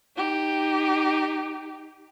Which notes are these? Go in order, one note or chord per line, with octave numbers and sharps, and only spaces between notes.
D#4 G4